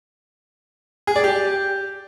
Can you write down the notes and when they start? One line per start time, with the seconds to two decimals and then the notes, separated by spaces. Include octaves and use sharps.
1.07 G#4
1.16 D5
1.24 G4